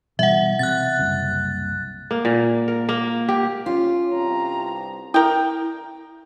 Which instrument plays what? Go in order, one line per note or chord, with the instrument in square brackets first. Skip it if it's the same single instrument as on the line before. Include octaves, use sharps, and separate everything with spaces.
[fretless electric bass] B2 E3 G3 [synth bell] E5 F#5
[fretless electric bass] C3 [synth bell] F#6 A6
[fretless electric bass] F#1 C2
[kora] A#3
A#2
A#4
A#3
G4
[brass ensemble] C#4 [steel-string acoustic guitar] F4
[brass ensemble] C2 G2 C3 [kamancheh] A#5
[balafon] E4 [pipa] A#4 G5